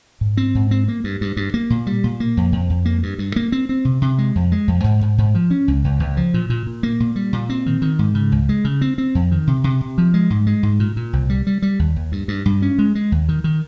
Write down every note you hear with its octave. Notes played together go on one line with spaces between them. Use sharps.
G#2
C4
G#2
C4
A#3
G2
G2
G2
A#3
A#2
G3
A#2
A#3
F2
F2
F2
A#3
G2
G2
A#3
C4
C4
C3
C3
G#3
F2
G#3
F2
G#2
G#2
G#2
F3
C#4
C#2
C#2
C#2
F3
A#2
A#2
A#2
A#3
A#2
G3
A#2
C4
D#3
D#3
G#2
C#3
C#2
G#3
C#3
C4
C4
F2
D#3
C3
C3
C3
F3
G#3
G#2
G#3
G#2
A#2
A#2
C2
G3
G3
G3
D#2
D#2
G2
G2
G2
C#4
G#3
G#3
D#2
D#3
D#3